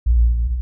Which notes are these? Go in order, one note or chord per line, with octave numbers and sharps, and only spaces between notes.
A#1